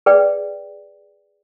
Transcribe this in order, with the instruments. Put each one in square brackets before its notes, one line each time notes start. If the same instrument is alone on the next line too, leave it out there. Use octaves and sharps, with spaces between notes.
[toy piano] G#4 B4 D5 G5